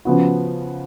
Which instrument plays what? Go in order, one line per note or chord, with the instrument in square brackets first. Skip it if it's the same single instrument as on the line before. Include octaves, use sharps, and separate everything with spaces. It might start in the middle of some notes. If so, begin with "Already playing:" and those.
[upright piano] C#3 F3 B3 F#4